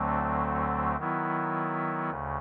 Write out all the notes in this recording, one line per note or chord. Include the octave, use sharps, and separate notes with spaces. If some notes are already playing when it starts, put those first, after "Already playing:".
Already playing: D2 D3 F#3 A3 C4
D#3 F#3 B3 E4
D2 C#3